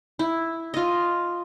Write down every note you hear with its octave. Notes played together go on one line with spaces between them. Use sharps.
E4
F4 D#5